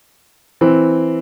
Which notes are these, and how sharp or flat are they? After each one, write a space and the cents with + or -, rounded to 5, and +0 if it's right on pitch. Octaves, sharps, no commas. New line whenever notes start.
E3 +0 C4 +0